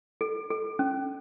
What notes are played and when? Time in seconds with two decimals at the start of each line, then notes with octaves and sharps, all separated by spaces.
0.21 A4
0.50 A4
0.79 C#4